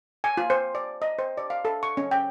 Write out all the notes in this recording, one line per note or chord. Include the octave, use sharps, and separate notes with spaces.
G#5
F4
C5
D5
D#5
C5
D5
F5
A4
C#6
C#4
G5